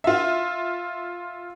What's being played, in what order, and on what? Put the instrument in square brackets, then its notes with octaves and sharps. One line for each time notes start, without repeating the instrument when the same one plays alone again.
[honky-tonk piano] F4 E5